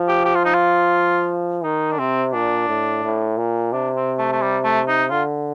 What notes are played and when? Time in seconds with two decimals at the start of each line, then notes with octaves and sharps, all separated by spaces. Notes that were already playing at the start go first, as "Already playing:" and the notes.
Already playing: F3
0.08 G4
0.25 G4
0.35 F4
0.45 D#4
0.54 F4
1.64 D#3 D#4
1.91 D4
1.98 C3 C4
2.33 A#2 D4
2.68 A2
3.03 A2
3.37 A#2
3.72 C3 D4
3.96 C4
4.19 A3
4.33 A3
4.42 G3
4.64 A3
4.88 D#4
5.11 D3 F4